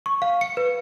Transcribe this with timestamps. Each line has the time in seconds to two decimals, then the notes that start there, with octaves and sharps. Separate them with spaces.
0.06 C#6
0.22 F5
0.41 C#7
0.57 B4